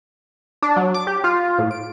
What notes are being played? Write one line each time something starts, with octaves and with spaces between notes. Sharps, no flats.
D4
F#3
D6
G4
F4
A2
D7